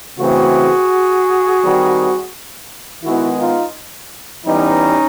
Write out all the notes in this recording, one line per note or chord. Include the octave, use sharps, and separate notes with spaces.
C#3 E3 A3 C4 F#4 G#4
D#3 G3 C4
D#3 G#3 B3 E4 F#4
D#4 F4
E3 G3 B3 C#4 D#4